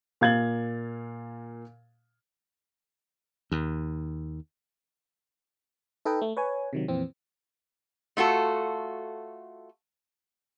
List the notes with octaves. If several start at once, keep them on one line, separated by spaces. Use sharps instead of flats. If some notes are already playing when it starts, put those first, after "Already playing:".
A#2 F5 G#6 A6 F#7
D#2
D#4 A4 B4 D#5 G5
A3
B4 C#5 G#5
C3 D#3 F#3
F2 A#2 E3 C4
A3 F4 F#4 A4